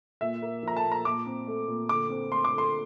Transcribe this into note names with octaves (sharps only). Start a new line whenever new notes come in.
A#2 E5
A#3
F3 A#5
A5
A#2
A#5
A#2 D6
C4
A3
A#2
D3 D6
C4
A3 C6
D6
D3
C6